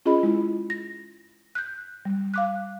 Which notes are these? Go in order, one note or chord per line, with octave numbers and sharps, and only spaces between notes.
C#4 F4 G#4 D#5 B5
G#3 E4
A#6
F#6 G6
G3
F5 D6 F#6